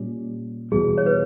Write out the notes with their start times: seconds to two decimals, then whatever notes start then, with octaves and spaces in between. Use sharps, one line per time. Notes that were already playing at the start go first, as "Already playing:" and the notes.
Already playing: A#2 G3 C#4
0.72 E2 B2 G3 G#4
0.98 C#5
1.06 B4